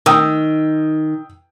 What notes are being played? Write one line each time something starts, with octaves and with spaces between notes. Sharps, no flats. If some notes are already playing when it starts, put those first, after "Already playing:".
D#3 G5 D#6 E6